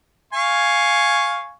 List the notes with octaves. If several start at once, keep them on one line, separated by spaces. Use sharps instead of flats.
F5 G#5 C#6